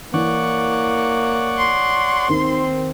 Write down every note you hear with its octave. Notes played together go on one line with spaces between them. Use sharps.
E3 A#3 C#5 D5 F#5
C6
D#2 D#3 C4